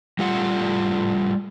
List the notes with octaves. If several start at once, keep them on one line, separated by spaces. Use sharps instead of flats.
G3 A3 F4 F#5